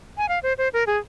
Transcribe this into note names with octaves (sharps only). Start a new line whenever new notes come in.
G#5
F5
C5
C5
A#4
G#4